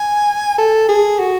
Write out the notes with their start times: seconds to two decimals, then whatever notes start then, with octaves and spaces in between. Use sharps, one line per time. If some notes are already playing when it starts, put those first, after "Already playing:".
Already playing: G#5
0.58 A4
0.89 G#4
1.19 F#4